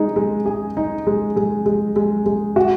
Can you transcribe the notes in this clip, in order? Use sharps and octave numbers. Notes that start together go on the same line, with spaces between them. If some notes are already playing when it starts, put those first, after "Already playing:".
Already playing: G#3 D#4
G#3
G#4
D#4
G#3
G#3
G#3
G#3
G#3
F#4